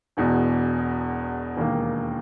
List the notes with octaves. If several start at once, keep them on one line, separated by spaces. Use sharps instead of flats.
E1 E2 B2
E1 D#2 D#3 A#3